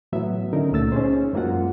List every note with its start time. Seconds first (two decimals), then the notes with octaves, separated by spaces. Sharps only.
0.12 A2 E3 F#3 B3 E5
0.53 D3 C#4 D#4 A#4
0.71 C#2 A#2 A3 E6 A6
0.92 C#4 D#4 G#4 C5
1.33 F#2 G#3 A#3 F4 F#4 F#5